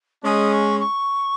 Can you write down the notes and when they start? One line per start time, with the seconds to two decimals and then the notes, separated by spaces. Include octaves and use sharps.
0.24 G#3 C#4 D#6
0.52 C#6
0.80 C#6